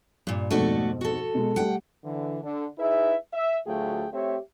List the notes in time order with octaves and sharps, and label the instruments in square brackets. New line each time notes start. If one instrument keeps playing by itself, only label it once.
[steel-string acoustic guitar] G2 A#2
[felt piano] F2 G#2 B2 [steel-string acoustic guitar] A3 F#4 D5
[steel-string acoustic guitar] F#4 A4
[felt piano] B2 G#3
[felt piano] G3 A3 [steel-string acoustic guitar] F#5 G5
[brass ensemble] D3 E3
D3
D#4 E4 G#4 B4 E5
E5
D2 F#3 A3 F4 G#4 G5
A3 C4 G4 C#5 E5